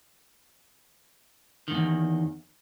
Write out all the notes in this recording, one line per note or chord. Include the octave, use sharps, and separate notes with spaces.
E2 G#2 D#3